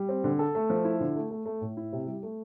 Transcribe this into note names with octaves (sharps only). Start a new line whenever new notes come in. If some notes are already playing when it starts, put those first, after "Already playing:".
Already playing: G3
C4
D3
A4
A3
F3
E4
D3
A3
A3
A3
A2
E4
C3
G3
A3